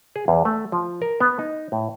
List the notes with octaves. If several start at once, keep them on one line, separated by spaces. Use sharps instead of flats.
G#4
E2
A3
F3
A#4
B3
D#4
A2